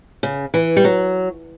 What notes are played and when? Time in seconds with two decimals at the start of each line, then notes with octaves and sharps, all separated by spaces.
0.23 C#3
0.54 E3
0.77 G3
0.84 F#3